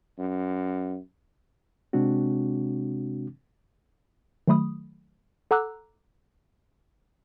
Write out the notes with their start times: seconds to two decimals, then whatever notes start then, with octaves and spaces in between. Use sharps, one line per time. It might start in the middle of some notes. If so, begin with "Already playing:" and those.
0.19 F#2
1.93 C3 G#3 C4 D4 F#4
4.48 D#3 F#3 A3 B5 D#6
5.51 A4 F#5 A#5 D6 E6 F#6